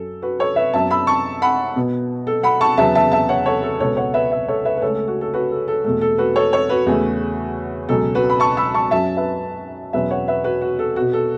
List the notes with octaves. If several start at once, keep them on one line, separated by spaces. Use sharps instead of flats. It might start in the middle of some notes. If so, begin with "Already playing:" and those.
Already playing: F#2 F#3 C#4 A4
F#4 B4
A4 C#5
B4 E5
F#2 F#3 B3 E5 A5
B5 E6
A5 C#6
F#5 B5
B2 B3
A4
F#5 B5
A5 C#6
E2 C#3 F#3 B3 E5 A5
E5 A5
E5 A5
C#5 F#5
A4 C#5
A4
C#2 B2 B3 A4 C#5
C#5 F#5
B4 E5
B4 E5
A4 C#5
B4 E5
B4
C#2 C#3 A3 C#4 A4 C#5
A4
F#4
A4
F#4 B4
A4
A4
E2 B2 A3 A4
A4
F#4 B4
A4 C#5
A4 C#5
F#4 B4
E2 C#3 A3 C#4
C#2 B2 F#3 C#4 A4
F#4 B4
B5
A5 C#6
B5 E6
A5 C#6
F#2 F#3 C#4 E5 A5
B4 E5
E2 B2 F#3 C#4 B4 E5
C#5 F#5
B4 E5
F#4 B4
F#4
A4
B2 B3 F#4
A4